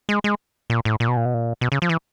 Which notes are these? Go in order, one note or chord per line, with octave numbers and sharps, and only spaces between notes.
G#3
G#3
A#2
A2
A#2
B2
A#2
B2
A#2
B2
C#3
F3
E3